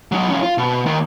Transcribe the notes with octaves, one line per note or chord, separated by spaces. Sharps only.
F#3 D#4
F3 C#4
F4
B2
D#2 D#3